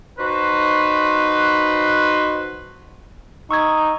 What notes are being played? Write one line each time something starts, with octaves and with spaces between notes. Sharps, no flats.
D#4 F#4 B4 C5
D#4 C#6 E6 G#6